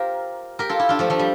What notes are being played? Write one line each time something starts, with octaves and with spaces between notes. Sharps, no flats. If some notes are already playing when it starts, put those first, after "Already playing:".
Already playing: F4 G4 A#4 C5
G4 A#4
F4 A4
E4 G4
D4 F4
F3 A3
F3 A3
G3